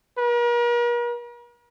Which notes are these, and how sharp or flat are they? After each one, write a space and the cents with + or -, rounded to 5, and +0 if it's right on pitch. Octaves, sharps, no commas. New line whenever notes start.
A#4 +45